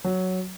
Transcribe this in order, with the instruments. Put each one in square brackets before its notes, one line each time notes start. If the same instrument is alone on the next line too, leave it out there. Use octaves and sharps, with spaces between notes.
[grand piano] F#3